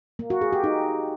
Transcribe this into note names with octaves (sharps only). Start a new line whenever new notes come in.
A#3
F#4
G#4
G4
D#4